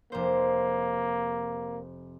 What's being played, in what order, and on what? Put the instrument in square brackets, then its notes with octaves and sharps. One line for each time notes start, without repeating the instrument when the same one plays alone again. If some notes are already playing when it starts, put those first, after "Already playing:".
[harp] F1 C5 [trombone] A#3